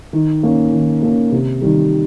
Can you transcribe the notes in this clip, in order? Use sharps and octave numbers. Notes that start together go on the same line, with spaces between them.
D#3
A#3 C#4
D#3
A#3 C#4
C3
D#3 G3